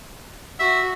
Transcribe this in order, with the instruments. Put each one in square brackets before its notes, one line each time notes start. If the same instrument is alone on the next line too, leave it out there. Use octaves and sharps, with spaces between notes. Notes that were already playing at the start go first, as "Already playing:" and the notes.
[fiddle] F#4 [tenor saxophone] E5